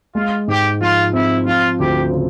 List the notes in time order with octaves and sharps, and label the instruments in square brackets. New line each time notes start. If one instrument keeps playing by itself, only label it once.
[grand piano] G#3 [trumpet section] F4
[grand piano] G#2 [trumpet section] G4
[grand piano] F3 [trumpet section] F4
[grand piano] C4 [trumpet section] E4
[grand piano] F3 [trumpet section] F4
[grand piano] D2 [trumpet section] G4
[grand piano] C#3